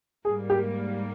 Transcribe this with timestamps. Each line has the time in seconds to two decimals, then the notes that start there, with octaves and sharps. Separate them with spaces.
0.25 G#2 G3 A#3 G#4
0.50 G4